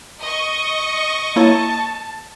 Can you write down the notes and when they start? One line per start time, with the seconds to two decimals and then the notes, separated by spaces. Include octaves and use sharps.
0.21 D#5 C#6
1.36 A#3 E4 C#5 A5